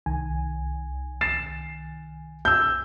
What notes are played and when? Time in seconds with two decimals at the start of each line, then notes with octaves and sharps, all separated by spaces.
0.06 C2 D#3 G#5
1.21 A6 C7 E7
2.45 E6 G6